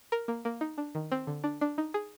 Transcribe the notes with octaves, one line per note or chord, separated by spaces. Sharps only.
A#4
A#3
A#3
D#4
D4
D#3
C4
D3
D4
D4
D#4
G#4